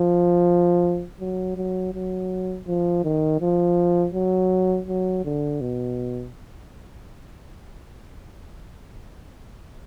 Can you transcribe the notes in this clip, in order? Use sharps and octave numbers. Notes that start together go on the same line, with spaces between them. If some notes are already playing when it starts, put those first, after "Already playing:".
Already playing: F3
F#3
F#3
F#3
F3
D#3
F3
F#3
F#3
D3
B2